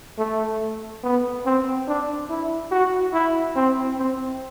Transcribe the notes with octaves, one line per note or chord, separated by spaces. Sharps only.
A3
B3
C4
D4
E4
F#4
E4
C4
C4